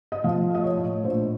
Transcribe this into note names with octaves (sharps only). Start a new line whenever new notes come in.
D#5
F3 F5
A3 D#5
C#5
A2
A#1 C5